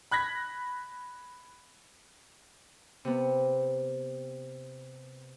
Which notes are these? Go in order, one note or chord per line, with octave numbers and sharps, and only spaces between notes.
B5 F#6 G#6 A#6 B6
C3 B3